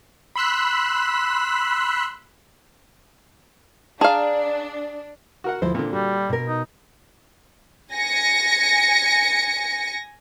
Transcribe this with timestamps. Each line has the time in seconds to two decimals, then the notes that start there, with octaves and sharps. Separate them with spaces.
0.36 B5 C6 E6 F#6 B6
4.01 D4 G#4 F5 A5 A#5
5.44 F#4 A#4 F#5
5.62 D2 F3 E4 C5
5.75 A#2 D3 C4
5.93 G3 F#4
6.29 B2 A#4
6.48 D#4
7.92 G#5 A#6 C#7